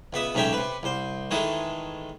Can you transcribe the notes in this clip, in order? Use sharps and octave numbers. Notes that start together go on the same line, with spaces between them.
C#2 B3 E5 D#6
B1 G#2 A3 C#4 E5 G5
C3 B4
C2 C5
D#3 E3 G#3 A3 D#6